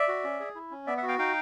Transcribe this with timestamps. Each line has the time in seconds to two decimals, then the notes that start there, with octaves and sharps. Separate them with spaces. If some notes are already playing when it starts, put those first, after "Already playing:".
Already playing: D5 E5
0.08 F#4
0.24 C#4
0.40 G#4
0.55 E4
0.71 C#4
0.87 B3 D5 E5
0.97 E5 F#5
1.03 F#4
1.08 F5 G5
1.19 D#4 F5 G5